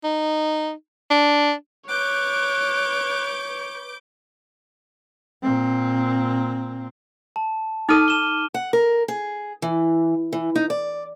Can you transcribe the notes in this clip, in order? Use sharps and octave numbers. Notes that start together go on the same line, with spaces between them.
D#4
D4
B4 C#5 D6 F#6 G6
A#2 C4
A5
D#4 A4 D6 F6 D#7
E7 G7
F#5
A#4
G#4
E3
E3
D#4
D5